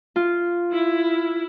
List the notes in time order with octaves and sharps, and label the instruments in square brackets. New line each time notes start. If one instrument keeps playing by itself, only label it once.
[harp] F4
[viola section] E4